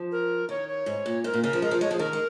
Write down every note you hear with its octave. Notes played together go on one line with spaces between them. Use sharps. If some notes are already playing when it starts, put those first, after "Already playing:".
Already playing: F3
A#4
D#3 C#5
C#5
G#2
A#2
G#2 A#4
A#2
C#3 A#4
F3
G#3 A#4
F3
G#3 C#5
F3 G#4
D#3 A#4
G#3